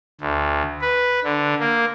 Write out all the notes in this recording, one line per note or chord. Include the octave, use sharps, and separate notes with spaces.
D2
B4
D3
A#3